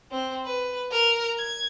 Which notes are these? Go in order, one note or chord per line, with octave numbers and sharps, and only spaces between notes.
C4
B4
A#4
G#6